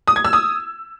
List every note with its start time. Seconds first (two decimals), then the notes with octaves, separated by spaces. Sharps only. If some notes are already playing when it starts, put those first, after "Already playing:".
0.08 D#6
0.16 G#6
0.25 E6
0.33 D#6